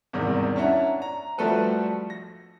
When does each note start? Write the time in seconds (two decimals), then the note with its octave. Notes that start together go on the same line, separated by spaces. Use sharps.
0.13 E2 G#2 C3 D#3 G3
0.56 C#4 D4 E4 F#5 A#5
1.02 A#5
1.38 F3 G3 A3 F#4 A4 B4
2.10 A#6